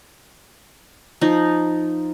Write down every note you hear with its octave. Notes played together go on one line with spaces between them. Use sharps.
F3 D#4